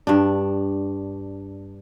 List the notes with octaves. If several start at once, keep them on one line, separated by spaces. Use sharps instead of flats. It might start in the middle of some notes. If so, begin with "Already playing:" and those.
G2 D4